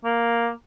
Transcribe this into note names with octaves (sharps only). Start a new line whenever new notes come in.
A#3